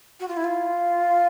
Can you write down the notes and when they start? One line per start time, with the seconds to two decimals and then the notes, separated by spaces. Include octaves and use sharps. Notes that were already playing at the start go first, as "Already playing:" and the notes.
0.20 F#4
0.28 F4
0.37 E4
0.44 F4